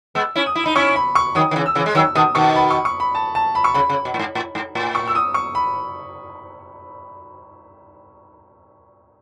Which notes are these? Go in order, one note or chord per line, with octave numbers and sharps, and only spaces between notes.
G#3 B3 E6
C#4 E4
D#6
E4
D#4 B5
C#4 E4 C#6
B5
C#6
D#3 F#3 D#6
D#3
C#3 E3
E6
C#3 E3
G#3
D#3 F#3 E6
B2 D#3 D#6
B2 D#3 C#6
B5
C#6
C#6
B5
A5
A5
B5
C#6
C#3 B5
C#3
B2
A2
G#2
A2
G#2
A2
C#6
E6
D#6
C#6
B5